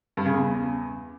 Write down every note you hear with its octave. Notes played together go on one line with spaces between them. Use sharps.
G2
C#3
E2